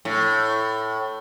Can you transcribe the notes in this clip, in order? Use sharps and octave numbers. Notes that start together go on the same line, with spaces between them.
A2